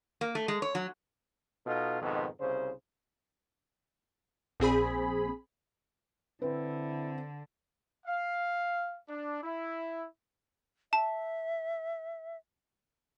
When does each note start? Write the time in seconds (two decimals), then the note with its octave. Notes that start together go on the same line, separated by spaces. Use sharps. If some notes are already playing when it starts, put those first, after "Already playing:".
0.21 A#3
0.35 A3
0.48 G#3
0.62 C#5
0.75 F#3
1.66 B2 D#4 F4 A4
2.02 F2 G#2 B2 D#3
2.41 C2 C#3 C5
4.60 A#1 C4 G#4 B5
6.42 D3 C4 E4 B4
8.06 F5
9.08 D4
9.41 E4
10.93 E5 A5